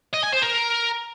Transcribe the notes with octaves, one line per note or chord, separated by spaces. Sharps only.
D#5
G#5
C5
A#4